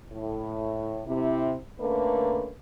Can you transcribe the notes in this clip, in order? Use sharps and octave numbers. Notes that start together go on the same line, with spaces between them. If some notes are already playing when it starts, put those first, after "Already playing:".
A2
C3 E4
D3 A3 A#3 C#4 A#4 B4